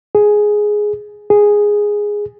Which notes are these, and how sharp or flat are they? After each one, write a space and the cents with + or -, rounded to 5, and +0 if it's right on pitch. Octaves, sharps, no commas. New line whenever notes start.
G#4 +5
G#4 -5